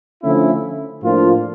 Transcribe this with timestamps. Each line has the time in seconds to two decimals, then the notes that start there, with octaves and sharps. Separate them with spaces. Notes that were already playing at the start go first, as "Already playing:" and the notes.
0.21 D3 F3 A3 C#4 E4
1.03 A2 F3 A#3 D4 F4